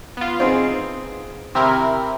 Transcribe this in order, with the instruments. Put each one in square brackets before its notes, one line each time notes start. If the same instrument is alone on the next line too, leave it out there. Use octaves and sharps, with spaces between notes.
[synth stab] B3 F4
[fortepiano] C4 D#4 G#4
[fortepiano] C3 [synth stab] C4 E4 A#4